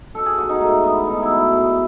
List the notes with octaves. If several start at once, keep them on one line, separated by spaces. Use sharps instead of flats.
B2 A4
G#4
F#3 F#4
D#4
G#2 A3
E3 B3
B2 D#4
E4
F#3
E4
G#2